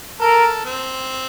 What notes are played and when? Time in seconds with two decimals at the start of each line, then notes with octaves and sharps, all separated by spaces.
0.21 A4 A#4
0.66 C4